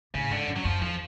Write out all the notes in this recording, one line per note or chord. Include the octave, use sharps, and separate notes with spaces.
A2 C#3
G#2 D3
F#2
F#3
F#2 F3
F2 F3